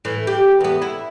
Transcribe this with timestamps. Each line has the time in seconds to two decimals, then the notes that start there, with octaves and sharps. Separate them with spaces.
0.05 A2 E3
0.27 G4
0.61 E2 B3
0.82 E4